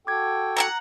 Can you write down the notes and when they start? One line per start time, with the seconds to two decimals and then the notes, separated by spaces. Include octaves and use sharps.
0.07 F#4 A4 G5 D6 G#6
0.57 F#5 A5 A#5